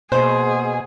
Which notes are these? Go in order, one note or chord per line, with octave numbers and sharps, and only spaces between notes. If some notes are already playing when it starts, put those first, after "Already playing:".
B2 A#3 G#4 C5 D#5 C6